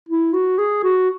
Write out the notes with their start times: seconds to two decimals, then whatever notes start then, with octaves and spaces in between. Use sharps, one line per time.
0.09 E4
0.33 F#4
0.58 G#4
0.83 F#4